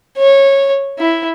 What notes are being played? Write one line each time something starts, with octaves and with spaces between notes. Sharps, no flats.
C#5
E4